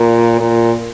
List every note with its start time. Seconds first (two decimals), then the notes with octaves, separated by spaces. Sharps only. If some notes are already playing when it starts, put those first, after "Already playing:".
Already playing: A#2
0.40 A#2